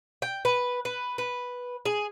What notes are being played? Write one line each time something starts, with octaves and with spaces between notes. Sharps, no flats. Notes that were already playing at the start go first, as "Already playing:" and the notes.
G5
B4
B4
B4
G#4